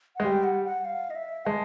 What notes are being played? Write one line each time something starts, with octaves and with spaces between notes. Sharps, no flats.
F#5
G#3
G3 G5
F#5
F#5
F5
D#5
E5
G#3 A5